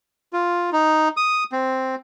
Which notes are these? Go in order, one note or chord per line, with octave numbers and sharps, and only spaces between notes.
F4
D#4
D#6
C4